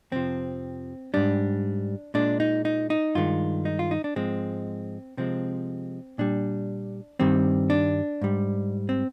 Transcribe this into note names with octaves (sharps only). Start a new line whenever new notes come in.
F2 C3 F3 C4
G#2 G3 D4
A#2 G#3 D4
D#4
D#4
D#4
G2 D#3 G#3 F4
D#4
F4
D#4
D4
G#2 F3 G#3 C4
C3 F3 G#3 C4
A#2 G3 D4
G2 D#3 G3 C4
D4
G#2 G3
C4